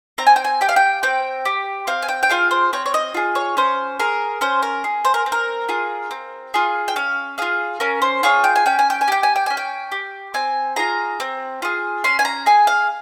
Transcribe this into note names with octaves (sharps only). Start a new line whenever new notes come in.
C4 A#5
G#5
G5
G#5
G4 G5
F5
G5
C4 G5
G4
C4 F5
G#5
G5
G5
F4 G#4 F5
C5
C4 C#5
C#5
D#5
F4 G#4
C#5
C#4 C5
G#4 A#4
C#4 C5
A#4
G#4
C5
A#4
C4
A#4
F4 G#4
C4
F4 G#4
G5
C#4 F5
F4 G#4 F5
C#4 A#4
C5
F4 G#4 C#5
G5
G#5
C#4 G5
G#5
G5
G#5
G4 G5
G#5
G5
C#4 G#5
G5
G4
C4 G#5
F4 G#4 A#5
C4
F4 G#4
C#4 C6
G#5
A#5
G#4 G#5
F5